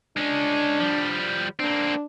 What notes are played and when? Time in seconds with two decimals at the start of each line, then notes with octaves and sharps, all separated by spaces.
0.17 G#3 C#4 D4
0.80 F3 G3
1.60 A#3 C4 D4